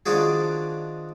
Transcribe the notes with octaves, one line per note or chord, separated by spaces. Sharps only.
D#3 F3 D4 F#4 G#4